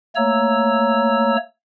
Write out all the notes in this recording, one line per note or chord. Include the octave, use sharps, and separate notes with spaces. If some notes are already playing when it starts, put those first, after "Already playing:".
A3 A#3 C#5 A#5 E6